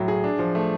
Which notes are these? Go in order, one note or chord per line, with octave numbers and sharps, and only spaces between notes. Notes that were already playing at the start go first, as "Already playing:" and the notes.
Already playing: A2 F#3
G#4
D4
F3
A3